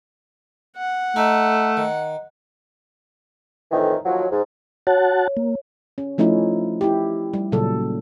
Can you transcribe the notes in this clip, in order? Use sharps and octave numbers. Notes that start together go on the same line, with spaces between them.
F#5
A3 D#4
D#3
F2 A2 D#3 E3
D#2 F3 F#3
G#2
F#4 C#5 F#5 A5
A#3
C#4
F3 A3 C#4 D#4 E4
E4 G4
G3
A#2 C#3 F#3 A4